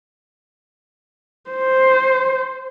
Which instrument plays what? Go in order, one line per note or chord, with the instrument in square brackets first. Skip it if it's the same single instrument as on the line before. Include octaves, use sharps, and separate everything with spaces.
[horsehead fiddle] C5